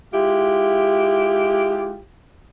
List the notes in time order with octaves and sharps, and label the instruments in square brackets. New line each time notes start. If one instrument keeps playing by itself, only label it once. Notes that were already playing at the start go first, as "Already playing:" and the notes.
[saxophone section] G#3 E4 F4 G4